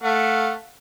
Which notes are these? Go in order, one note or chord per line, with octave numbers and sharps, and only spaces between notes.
A3 F5 F#5